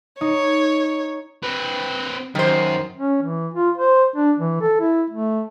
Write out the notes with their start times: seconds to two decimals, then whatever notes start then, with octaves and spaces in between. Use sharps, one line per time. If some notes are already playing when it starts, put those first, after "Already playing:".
0.21 D#4 C#5
1.43 C4 B4
2.35 F#2 D#3 C5
2.97 C#4
3.22 E3
3.54 F4
3.77 C5
4.16 D4
4.38 E3
4.61 A4
4.80 E4
5.10 A3